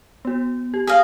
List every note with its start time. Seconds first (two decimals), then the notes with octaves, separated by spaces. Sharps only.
0.25 B3 F#4
0.74 G4
0.87 G#4 D#5 F5